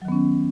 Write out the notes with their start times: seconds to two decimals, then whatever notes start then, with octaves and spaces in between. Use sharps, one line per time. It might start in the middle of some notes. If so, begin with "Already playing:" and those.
0.02 F#3
0.05 D#3
0.08 B3
0.12 C#4